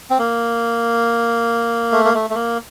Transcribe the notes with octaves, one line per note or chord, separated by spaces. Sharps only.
C4
A#3
A3
A#3
A3
A3
A#3